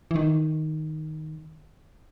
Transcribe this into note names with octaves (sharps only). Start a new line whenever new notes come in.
E3
D#3